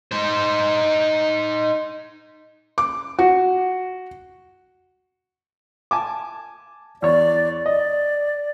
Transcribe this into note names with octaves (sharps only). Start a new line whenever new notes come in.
D#4 C5
D6
F#4
G#5 A5 D6
E2 C#5 D5
D5 D#5